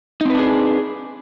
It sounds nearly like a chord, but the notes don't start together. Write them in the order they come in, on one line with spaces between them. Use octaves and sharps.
D#4 C4 B4 D4 G#4